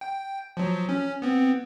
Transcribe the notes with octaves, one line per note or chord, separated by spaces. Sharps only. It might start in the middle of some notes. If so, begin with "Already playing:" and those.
G5
F3 F#3
C#4
B3 C4